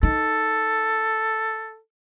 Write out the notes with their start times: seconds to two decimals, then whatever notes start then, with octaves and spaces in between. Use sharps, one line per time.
0.03 D#4 A4